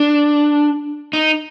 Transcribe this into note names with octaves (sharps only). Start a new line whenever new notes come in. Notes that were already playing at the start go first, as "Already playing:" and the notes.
Already playing: D4
D#4